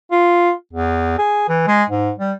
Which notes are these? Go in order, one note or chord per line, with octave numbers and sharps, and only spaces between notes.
F4
E2
G#4
E3
G#3
G#2
G3